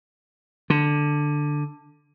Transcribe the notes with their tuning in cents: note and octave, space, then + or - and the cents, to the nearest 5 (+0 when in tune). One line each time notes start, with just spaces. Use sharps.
D3 +5